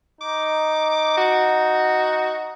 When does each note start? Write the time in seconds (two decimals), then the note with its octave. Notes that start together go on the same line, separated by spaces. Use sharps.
0.21 D#4 D6
1.17 F#4